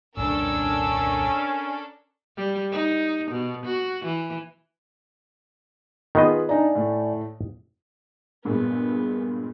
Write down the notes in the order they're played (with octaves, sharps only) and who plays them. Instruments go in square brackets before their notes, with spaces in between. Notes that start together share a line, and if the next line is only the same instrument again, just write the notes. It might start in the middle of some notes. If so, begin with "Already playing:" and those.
[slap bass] D#1 C2 F2 [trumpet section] C#4 [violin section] D4 A4 A#4 [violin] E6
[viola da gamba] G3
D#4
B2
F#4
E3
[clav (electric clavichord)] D#3 B3 D#5 [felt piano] F4 G#4 B4
[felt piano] D4 D#4 A#5 [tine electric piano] D5 E5 G#5
[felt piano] A2 A3
[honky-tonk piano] G2 A#2 G#3 [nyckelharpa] B3